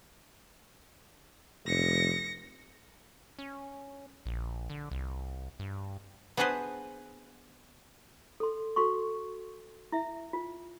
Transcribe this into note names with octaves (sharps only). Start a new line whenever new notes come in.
F1 A#6 C#7
C#4
A#1
D3
C2
G2
B3 D4 F#4 G#4 B4 C5
A4 C6
F#4 A4 C6 C#6
E4 E5
F4